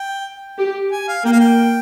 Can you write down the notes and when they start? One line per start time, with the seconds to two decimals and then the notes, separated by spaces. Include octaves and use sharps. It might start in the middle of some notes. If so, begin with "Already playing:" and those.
Already playing: G5
0.58 G4
0.92 G#5
1.08 F5
1.24 A#3 G5
1.33 F5
1.40 G5